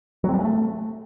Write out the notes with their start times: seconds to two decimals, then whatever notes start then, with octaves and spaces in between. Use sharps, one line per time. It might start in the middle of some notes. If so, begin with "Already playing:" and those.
0.24 F#3
0.29 C4
0.34 G3
0.39 G#3
0.44 A3